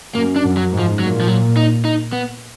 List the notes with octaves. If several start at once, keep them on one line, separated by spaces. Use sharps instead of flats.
F#2 A#3
D4
F#2
F#3
G#2
F3
A#2 F#3
F3
F#3
D#4
D#4
B3